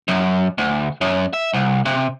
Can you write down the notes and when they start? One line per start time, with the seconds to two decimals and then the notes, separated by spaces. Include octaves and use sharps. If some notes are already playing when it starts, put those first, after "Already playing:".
0.08 F#2
0.58 D2
1.01 F#2
1.34 E5
1.54 C2
1.86 C3